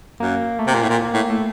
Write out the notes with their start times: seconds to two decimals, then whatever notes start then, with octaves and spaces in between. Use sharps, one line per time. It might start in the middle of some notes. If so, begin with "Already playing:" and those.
0.20 F#2 A#3
0.59 A3
0.67 C3 A#3
0.75 A#2
0.82 A2
0.90 A#2
1.14 A2 A#3
1.30 A3